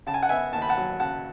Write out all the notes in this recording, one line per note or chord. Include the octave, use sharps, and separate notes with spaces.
C#3 A5
G#5
F#5
B3 E5 G#5
D#2 A5
B5
F#5 A5
F#3
C#3 F#5 A5